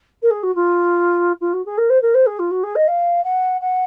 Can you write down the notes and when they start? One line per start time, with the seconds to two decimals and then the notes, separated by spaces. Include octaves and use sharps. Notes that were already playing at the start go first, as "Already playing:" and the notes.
0.22 A#4
0.31 G#4
0.43 F#4
0.55 F4
1.41 F4
1.53 F#4
1.65 G#4
1.78 A#4
1.90 C5
2.02 A#4
2.14 C5
2.26 G#4
2.39 F4
2.51 F#4
2.63 G#4
2.75 D#5
2.87 F5
3.24 F#5
3.61 F#5